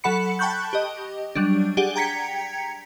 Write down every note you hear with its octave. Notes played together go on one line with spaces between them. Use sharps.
F#3 A4 F#5 B5 C#7
G5 A5 B5 C#6 F#6 G6
G4 D#5
F#3 G3 D4
D4 G4 G#4 D5 F#5
G5 A#5 G#6 B6 C#7